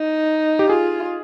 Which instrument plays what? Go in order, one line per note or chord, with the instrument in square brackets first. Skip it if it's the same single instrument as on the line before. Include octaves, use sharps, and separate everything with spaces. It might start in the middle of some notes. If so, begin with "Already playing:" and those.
Already playing: [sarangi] D#4
[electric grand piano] G4
[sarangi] F4 [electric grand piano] G#4